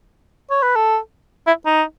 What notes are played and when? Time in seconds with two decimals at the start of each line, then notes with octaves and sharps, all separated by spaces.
0.51 C#5
0.62 B4
0.76 A4
1.47 E4
1.66 D#4